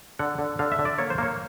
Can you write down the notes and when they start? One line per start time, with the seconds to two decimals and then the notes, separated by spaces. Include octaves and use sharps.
0.19 D3 F#5
0.39 D3
0.59 D3 F5
0.72 E5
0.79 D3
0.85 D5
0.98 A#3 C#5
1.10 C5
1.18 A#3 C#5